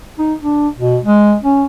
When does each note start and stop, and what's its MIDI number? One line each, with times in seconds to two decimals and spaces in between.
0.19 0.33 63
0.42 0.68 62
0.78 0.98 47
1.05 1.35 56
1.43 1.65 61